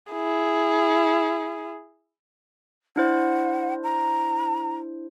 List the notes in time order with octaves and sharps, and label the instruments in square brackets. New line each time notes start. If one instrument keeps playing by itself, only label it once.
[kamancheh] E4 G#4
[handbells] D4 E4 C5 [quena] F#5
[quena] A#5